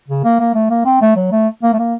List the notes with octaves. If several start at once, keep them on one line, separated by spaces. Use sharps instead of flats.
C#3
A#3
A#3
A3
A#3
C4
A3
F#3
A3
A#3
A3
A#3